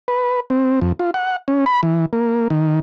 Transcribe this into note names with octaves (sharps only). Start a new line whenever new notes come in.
B4
C4
F2
F4
F#5
C#4
B5
E3
A#3
D#3